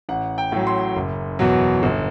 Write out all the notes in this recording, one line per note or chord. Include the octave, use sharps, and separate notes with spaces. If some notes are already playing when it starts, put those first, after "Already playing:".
A1 F#5
G5
A2 F#3
C6
F#1
E2 B2 F#3
G1